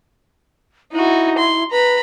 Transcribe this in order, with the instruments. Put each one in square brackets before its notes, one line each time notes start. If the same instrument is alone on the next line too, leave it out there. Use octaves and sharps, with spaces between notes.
[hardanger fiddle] D#4 F#4 [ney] E4
[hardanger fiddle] C6
[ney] B4 [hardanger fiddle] A#5 B5